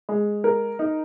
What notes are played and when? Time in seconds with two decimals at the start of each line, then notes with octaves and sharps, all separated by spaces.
0.09 G#3
0.44 A#4
0.79 D#4